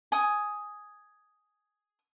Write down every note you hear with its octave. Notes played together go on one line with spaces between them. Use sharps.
G#5 D#6